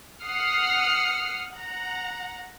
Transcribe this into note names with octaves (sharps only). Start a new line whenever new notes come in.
F#5 D#6 F6 C7 C#7
F#5 A#5